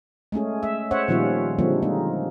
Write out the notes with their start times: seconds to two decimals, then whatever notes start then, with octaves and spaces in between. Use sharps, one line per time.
0.32 G#3 A3 C#4 G#4
0.63 E5
0.91 C#4 C5 C#5 E5 F#5
1.08 A#2 D#3 F3 G3 C#4 F4
1.59 D3 F3 G3 G#3 A#3 C4
1.82 G#3 A#3 D#4